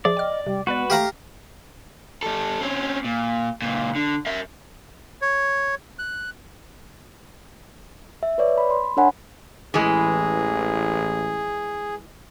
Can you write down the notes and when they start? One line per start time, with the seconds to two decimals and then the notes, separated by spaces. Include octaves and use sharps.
0.05 F3 G#4 D5 E5
0.17 D#5 G5 F6
0.46 C3 G3
0.67 G#3 B3 F#4 B4 D5
0.90 A3 G4 F5 A#5
2.23 G3 A4
2.61 C4 C#4
3.04 A#2
3.62 C#2 A#2
3.95 D3
4.26 A#4 E5
5.22 C#5
5.99 F#6
8.23 E5
8.38 B4 C#5 D5
8.58 B5
8.70 C6
8.97 D4 A#4 C#5 F#5 G#5 B5
9.74 A1 E3 G#3 G#4